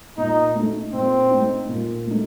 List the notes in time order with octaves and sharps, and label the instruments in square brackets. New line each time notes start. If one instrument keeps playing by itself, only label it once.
[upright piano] A#2 [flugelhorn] D#4
[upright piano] A3 D#4
[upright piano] A#2 [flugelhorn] C4
[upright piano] A3 D#4
A#2
A3 D#4